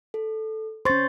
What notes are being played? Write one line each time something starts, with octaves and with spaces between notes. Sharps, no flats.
A4
C#4 C5 C6 C#6 A6